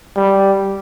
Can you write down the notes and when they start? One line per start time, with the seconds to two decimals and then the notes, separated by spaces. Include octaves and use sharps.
0.16 G3